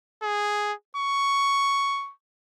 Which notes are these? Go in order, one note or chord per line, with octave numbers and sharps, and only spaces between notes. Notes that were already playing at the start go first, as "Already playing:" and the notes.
G#4
C#6